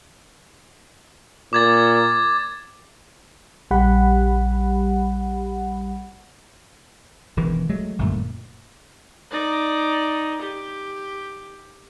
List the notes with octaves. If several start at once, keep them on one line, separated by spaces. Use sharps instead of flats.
A#2 D6 G#6 A6
A#1 G3 G4 F#5 B5
E1 D#3 E3
F#3 G#3 A3
G1 F#2 A#2 A3
D#4 D5
G4